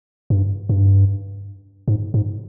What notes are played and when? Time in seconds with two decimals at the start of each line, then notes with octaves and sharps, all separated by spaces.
0.30 G2
0.69 G2
1.88 G#2
2.14 G#2